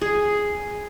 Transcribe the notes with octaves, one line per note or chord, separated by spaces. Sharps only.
G#4